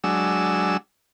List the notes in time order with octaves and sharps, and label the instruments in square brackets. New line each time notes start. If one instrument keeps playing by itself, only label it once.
[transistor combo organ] F#3 G#3 D4 E6